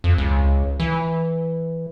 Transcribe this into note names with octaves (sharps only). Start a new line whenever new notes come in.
F2
C#2
E3